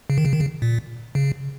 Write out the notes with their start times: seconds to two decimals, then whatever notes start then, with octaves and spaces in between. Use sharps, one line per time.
0.10 C#3
0.18 D#3
0.25 C#3
0.33 D#3
0.40 C#3
0.62 A#2
1.15 C#3